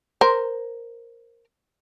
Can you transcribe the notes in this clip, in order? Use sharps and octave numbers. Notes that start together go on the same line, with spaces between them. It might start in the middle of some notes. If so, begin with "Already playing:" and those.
A#4 C5